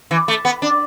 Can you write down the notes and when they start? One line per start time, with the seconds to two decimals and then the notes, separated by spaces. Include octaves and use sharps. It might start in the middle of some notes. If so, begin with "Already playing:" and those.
0.11 E3
0.28 A3
0.45 B3
0.62 D4